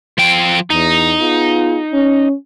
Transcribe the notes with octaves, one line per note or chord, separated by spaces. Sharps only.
F3 G5
E2 D#4
B3 F4 G#4
C#4